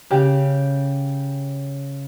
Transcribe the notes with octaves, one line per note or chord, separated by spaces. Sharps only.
C#3 G4